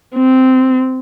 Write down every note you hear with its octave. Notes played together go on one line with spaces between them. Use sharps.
C4